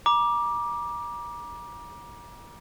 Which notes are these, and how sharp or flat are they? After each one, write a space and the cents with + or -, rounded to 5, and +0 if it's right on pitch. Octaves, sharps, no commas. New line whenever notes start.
A#5 +35 D6 +5